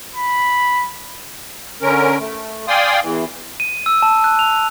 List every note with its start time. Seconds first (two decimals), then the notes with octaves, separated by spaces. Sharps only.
0.15 B5
1.82 D3 C#4 A#4
2.20 A3
2.68 D5 F5 G5 G#5 C6 D#6
3.02 E2 E3
3.60 D#7
3.86 E6
4.02 A5
4.24 F#6
4.39 F7